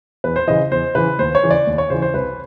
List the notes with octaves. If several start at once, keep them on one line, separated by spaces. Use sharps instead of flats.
E2 B4
C5
C#3 E3 D#5
E2 C5
C#3 E3 B4
D#2 C5
C#5
C#3 E3
D5
D#2
C#5
C#3 E3 C5
C5
C2 B4